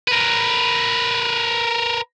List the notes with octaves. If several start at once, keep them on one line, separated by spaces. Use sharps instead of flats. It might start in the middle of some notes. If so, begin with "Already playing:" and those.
A#4 B4